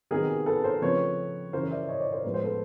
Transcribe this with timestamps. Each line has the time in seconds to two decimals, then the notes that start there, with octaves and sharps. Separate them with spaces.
0.11 C3 D#3 F#3 B3 G#4 A#4
0.46 A4 B4
0.64 A#4 C5
0.82 C#3 F3 A3 C4 B4 C#5
1.53 F#2 C#3 E3 A#4 C5
1.71 D5 E5
1.89 C#5 D#5
2.00 C5 D5
2.12 A#4 C5
2.24 A2 F3 G#3 B3 B4
2.34 C5
2.44 A4 B4